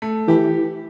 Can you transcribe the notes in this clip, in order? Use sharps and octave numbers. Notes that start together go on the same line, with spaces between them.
A3
E3 G4